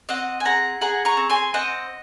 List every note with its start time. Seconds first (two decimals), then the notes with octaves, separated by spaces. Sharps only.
0.09 C4 D#5 F#5
0.40 G#5
0.45 G#4 F#5 A#5
0.81 G#4 F#5 A#5
1.05 A#5 C#6
1.17 C4
1.30 G#5 C6
1.54 C4 D#5 F#5